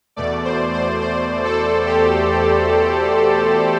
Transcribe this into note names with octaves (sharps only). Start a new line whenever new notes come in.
E2 B2 A3 D5
C5
C5
C5
A4
G4